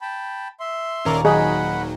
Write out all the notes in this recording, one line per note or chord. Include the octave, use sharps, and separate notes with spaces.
G5 A5 B5
E5 C6
D#1 C#4 A#4 D5 A#5 C#6
D#3 F#3 G#4 D#5 F#5 B5